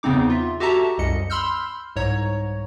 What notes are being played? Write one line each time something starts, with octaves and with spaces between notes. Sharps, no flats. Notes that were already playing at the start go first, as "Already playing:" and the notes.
E2 C#3 B3 C4 D#4 D6
F4 E5
F#4 G4 A4 E5 A5 A#5
C2 F#2 D#5 C#7
B5 C6 E6 F6 G6
C2 G#2 C#5 A#5